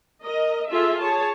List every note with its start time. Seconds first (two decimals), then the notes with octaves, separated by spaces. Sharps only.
0.22 A#4 D#5
0.70 F4 G#4 A4 E5
1.00 G#4 C#5 A5